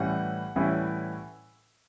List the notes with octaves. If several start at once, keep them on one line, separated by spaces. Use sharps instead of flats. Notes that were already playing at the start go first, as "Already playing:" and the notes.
Already playing: A2 E3 G3 C#4 E4 F#5
A2 E3 G3 C#4 E4